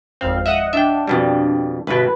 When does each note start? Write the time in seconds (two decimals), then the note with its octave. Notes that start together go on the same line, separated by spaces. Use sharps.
0.21 G#1 F2 C4 F5
0.46 D#5 E5 F#5
0.73 D4 E5 G5
1.08 F2 B2 G3
1.87 G1 B2 B4